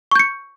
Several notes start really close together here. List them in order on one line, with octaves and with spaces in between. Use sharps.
C#6 G6 C#7